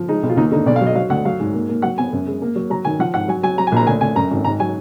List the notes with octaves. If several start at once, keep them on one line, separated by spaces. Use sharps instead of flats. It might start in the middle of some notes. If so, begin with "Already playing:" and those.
Already playing: F3
G#3 D#4
B1
F4
D#2 D#4
D3 D#4
B1 D5
F5
F#3
D#5
F#3 F5
D2 F#5
F#3 F5
G#2
A#3
A#3
F#3 F#5
B3 G#5
F#2
G#3
A#3
F#3
F#3 A#5
D#3 G#5
F3 F#5
G#2 F#5
F#3 G#5
F#3 G#5
F#3 A#5
G#5
A#1 A#5
D2 G#5
D2 G#5
F#2 A#5
G#1
G#2 A#5
F#3 G#5